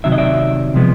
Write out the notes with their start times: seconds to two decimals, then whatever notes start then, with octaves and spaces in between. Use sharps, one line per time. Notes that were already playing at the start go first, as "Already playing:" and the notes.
0.04 C3 D#3 F#3 E5
0.12 D#5
0.18 D5 E5
0.74 C3 F3 G#3 B3